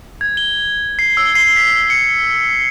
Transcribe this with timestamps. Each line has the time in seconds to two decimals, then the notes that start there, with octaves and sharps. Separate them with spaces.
0.21 G#6
0.37 G7
0.99 C7
1.17 E6
1.35 C7
1.56 B6
1.90 C#7